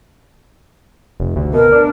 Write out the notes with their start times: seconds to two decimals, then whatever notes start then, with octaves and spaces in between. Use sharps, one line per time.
1.20 F1
1.36 D2
1.54 B2 A#4
1.72 D4